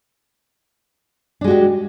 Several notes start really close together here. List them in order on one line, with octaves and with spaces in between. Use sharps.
D4 G#3 F#4 G4